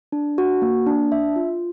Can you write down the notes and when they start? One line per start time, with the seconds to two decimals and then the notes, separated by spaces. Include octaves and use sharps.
0.12 D4
0.38 F#4
0.62 A#3
0.87 D4
1.12 E5
1.36 F4